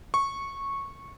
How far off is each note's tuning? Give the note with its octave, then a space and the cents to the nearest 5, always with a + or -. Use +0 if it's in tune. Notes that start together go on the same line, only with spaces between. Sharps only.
C#6 -10